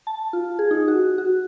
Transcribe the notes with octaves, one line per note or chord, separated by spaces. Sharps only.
A5
F4
G#4
D#4
F#4
F#4